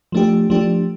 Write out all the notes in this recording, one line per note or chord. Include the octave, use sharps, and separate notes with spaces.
F3 A3 D4 G4
F3 A3 D4 G4